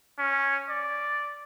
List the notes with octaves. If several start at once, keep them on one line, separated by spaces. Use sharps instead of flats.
C#4
D5